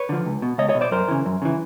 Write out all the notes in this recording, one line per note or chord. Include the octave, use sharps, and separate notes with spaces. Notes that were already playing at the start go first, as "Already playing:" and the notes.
Already playing: B4 C#5
D3 F3
C#2
B2
C#2 C#5 D#5
C#5 D#5
B2
C5 D5
F#2 A#4 C5
C#3 E3
F#2
C#3 E3